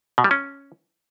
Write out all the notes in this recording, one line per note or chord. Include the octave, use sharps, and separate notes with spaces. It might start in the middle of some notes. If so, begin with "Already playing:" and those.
B2
G3
C#4